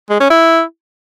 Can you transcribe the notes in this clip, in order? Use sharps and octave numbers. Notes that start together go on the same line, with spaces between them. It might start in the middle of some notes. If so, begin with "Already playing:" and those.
G#3
C#4
E4